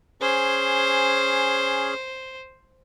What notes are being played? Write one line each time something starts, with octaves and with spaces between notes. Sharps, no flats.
C#4 G#4 C5